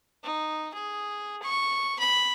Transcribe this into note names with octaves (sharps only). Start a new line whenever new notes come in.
D#4
G#4
C#6
B5